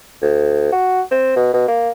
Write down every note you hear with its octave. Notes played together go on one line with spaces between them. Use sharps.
D2
F#4
C4
B2
B2
A#3